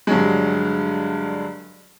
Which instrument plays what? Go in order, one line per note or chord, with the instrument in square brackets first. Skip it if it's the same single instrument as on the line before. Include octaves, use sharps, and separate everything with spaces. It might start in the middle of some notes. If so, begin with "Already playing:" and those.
[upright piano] G2 D3 F#3 G#3